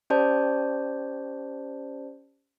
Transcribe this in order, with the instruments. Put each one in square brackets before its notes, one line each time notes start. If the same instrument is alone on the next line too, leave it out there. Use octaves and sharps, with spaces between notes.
[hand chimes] C#4 G4 C5 D5 A5 G6